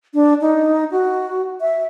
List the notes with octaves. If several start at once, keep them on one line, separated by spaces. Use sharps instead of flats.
D4
D#4
F#4
E5